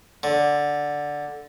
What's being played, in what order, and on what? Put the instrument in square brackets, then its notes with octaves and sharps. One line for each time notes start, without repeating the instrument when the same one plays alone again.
[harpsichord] D3